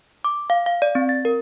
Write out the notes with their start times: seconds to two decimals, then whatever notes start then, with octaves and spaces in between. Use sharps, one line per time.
0.24 D6
0.50 F5
0.66 F5
0.82 D5
0.95 C4
1.09 A6
1.25 A#4